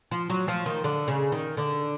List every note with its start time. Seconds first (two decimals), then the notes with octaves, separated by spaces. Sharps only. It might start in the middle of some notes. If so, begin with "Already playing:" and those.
0.11 F3
0.30 F#3
0.48 F3
0.66 D#3
0.84 D3
1.08 C#3
1.32 D#3
1.57 D3